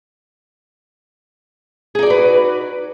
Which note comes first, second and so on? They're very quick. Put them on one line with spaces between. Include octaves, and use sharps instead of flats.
G#4 D#4 D5 F#4 B4